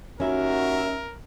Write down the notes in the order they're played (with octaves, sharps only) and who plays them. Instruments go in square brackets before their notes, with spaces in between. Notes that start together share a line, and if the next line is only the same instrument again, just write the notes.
[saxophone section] D#2 D#3 E5 [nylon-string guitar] C#4 [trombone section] F#4 [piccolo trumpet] A#4